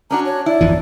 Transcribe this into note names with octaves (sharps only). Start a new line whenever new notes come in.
C#4 D4 F#4 A#5
C#5
E4 D5
G1 F2 E3